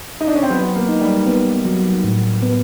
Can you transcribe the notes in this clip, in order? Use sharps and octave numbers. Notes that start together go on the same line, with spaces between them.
D#4
D4
C#4
C4
F#3 B3
A#3
D#4
G3
B3
F#3
A2
B3